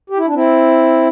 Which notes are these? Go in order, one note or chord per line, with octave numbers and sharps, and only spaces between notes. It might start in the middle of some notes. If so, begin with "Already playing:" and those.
G4
E4
D4
C4 E4